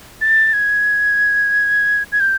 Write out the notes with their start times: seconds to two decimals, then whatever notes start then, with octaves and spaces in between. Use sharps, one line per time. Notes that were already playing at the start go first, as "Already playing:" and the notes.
0.21 A6
0.53 G#6
2.12 G#6
2.20 G6